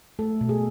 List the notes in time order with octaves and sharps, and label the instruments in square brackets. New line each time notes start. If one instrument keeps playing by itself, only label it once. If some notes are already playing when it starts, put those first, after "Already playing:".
[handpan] A3 A4
B2
G#4